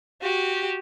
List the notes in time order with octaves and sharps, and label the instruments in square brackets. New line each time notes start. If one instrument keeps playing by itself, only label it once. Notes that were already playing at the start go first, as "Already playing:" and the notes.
[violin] F#4 G4